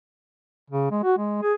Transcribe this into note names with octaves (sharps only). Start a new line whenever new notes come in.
C#3
G#3
F#4
G#3
G#4